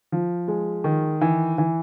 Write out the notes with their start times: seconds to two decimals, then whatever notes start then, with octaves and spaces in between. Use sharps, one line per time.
0.12 F3
0.48 G#3
0.84 D#3
1.21 E3
1.58 E3